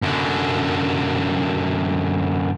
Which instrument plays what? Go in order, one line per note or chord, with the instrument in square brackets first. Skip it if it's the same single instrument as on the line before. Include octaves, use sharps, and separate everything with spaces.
[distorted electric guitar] F#2 D3